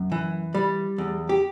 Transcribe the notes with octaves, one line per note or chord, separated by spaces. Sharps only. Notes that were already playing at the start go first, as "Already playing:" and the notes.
Already playing: F#2
E3
G3
E2
G4